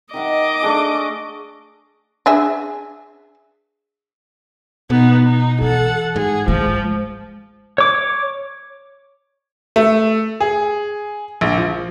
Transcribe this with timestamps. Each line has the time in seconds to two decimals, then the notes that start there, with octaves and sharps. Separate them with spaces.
0.14 D#3 D#5 E5 F#5 D6
0.62 A3 D4 G#4
2.26 D4 G#4 E5
4.90 B2 B3 D#4
5.24 D#4
5.61 E3 A4 F#5
6.16 G#2 G#4
6.48 F3 G#3
7.78 C#5 D6
9.76 A3
10.41 G#4
11.41 A#1
11.58 F3